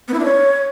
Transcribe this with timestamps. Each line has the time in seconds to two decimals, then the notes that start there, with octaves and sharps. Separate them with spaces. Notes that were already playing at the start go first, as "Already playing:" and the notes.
0.08 B3
0.14 E4
0.19 D4
0.25 C#5